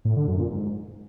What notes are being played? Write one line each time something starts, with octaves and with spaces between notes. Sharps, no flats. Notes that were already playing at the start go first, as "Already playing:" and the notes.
A2
D3
F#2
A#2
G#2